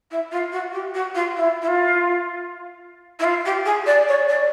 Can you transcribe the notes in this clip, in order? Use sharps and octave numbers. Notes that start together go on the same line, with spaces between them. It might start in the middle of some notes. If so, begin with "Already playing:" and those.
E4
F4
F#4
G4
F#4
F4
E4
E4
F4
E4
F4
G4
G#4
D5
C#5
D5